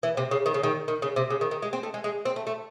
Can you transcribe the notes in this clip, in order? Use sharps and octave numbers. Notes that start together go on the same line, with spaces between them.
E3
C3
C#3
D#3
C#3
D#3
D#3
C#3
C3
C#3
D#3
D#3
G#3
C4
A3
G#3
G#3
C4
A3
A3